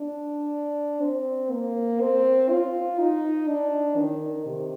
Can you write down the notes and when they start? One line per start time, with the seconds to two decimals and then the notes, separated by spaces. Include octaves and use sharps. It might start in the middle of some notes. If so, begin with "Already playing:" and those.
Already playing: D4
1.01 C4
1.51 A#3
2.00 C4
2.50 F4
2.99 D#4
3.48 D4
3.97 D#3
4.46 C3